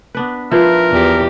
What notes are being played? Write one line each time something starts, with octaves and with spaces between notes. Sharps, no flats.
B3 D4 B4
F3 E4 F4 A#4 B4 E5
E2 G4